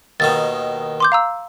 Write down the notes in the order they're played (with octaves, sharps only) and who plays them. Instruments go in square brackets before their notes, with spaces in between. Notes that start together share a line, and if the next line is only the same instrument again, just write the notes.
[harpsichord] D#2 B2 D#3 [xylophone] A6
[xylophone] C6 D6 G6
F5 A#5 E6